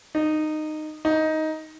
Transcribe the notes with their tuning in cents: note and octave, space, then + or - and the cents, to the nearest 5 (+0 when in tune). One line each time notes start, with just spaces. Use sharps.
D#4 -15
D#4 +10